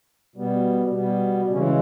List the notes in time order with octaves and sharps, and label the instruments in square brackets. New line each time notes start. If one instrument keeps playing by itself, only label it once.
[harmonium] B2 G3 B3
B2 G3 B3
C#3 E3 G#3 C#4